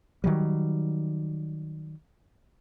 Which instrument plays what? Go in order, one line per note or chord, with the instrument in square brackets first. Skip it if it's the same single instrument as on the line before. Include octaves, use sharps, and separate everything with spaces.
[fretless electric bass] D#3 F#3 G3